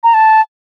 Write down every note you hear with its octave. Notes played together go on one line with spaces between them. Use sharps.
A#5
A5